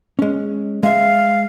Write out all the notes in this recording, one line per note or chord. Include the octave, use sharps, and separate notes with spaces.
G#3 C#4
G#3 E5 F5